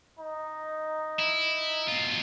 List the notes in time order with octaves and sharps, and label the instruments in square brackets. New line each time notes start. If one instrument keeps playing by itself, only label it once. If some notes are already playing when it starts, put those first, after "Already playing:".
[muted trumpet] D#4
[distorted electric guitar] E4
B2 F4